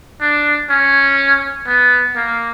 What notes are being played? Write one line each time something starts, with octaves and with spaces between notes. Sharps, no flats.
D4
C#4
B3
A#3